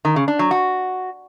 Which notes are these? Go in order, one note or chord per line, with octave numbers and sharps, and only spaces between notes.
D#3
C#3
D4
F#3
F#4